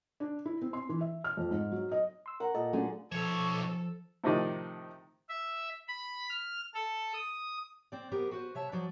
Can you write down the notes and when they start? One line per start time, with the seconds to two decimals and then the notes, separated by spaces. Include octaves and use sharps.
0.20 D4
0.46 E4
0.62 C4
0.73 C6
0.89 E3
1.01 E5
1.24 F6
1.37 F2
1.51 G#2
1.72 F#3
1.91 D#5
2.26 C6 E6
2.40 A#4 F#5 A#5
2.55 A#2 A4 D#5 A5
2.73 D3 F#3 A3 C#4 G#4
3.12 B1 F3 A4 C#5
4.24 A2 C3 D#3 F3 D#4 D5
5.29 E5
5.88 B5
6.29 F6
6.74 A4
7.14 D#6
7.92 C4 D5
8.11 B3 G4 A#4 C5
8.31 F#4 B4 C5
8.55 C3 C#5 E5 A5
8.72 F3 F#3 B4 C5 D5